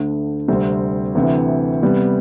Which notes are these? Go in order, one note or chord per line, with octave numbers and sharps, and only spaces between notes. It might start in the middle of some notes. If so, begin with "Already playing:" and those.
Already playing: D2 D3 A3
D2 C3 G3 C4
D2 C3 E3
C3 G3 B3